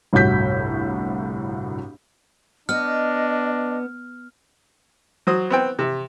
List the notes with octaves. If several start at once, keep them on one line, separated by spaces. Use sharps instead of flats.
G1 C2 A2 F#4 G6 B6
B3 D4 D#5 F6
F#3 F#4 C5 D#6
B3 C4 G5
C3